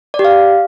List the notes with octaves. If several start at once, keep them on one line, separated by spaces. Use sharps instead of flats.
D5
G4
F5